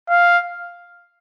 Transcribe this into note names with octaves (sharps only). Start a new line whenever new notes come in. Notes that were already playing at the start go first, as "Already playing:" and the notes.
F5